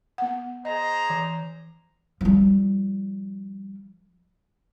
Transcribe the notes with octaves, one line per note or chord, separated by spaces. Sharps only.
B3 F#5
G#4 C5 D#5 A#5
E3
F3 G3